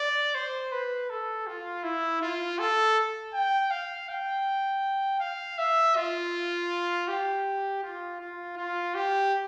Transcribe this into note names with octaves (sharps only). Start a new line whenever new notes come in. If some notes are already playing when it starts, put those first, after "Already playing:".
Already playing: D5
C5
B4
A4
F4
E4
F4
A4
G5
F5
G5
F5
E5
F4
G4
F4
F4
F4
G4